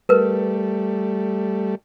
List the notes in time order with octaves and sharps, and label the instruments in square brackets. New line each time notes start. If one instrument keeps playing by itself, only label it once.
[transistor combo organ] G3 A3 [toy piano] A#4 B4